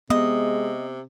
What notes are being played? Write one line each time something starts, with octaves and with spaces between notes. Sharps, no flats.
C3 G#3 B3 D#5